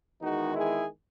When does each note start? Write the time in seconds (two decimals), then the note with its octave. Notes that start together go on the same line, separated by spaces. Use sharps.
0.21 E2 D#3 G#3 D#4 F#4
0.55 E4 G#4